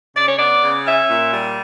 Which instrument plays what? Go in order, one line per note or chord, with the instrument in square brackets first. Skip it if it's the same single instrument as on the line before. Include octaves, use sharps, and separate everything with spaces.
[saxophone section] C#3 D5
C#5
B3 D5
C#3
C#4 E5
A#2
G3